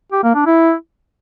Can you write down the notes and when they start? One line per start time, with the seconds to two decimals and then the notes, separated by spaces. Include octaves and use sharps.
0.12 G4
0.24 A#3
0.35 D4
0.46 E4